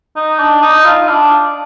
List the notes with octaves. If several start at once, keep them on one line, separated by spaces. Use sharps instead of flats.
D#4
D4
D#4
F4
D4